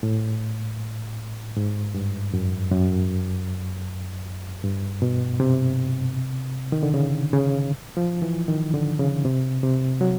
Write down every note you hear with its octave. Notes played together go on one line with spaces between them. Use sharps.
A2
G#2
G2
F#2
F#2
G2
B2
C3
D#3
D3
C#3
C#3
F3
E3
D#3
D3
C#3
C3
C3
F#3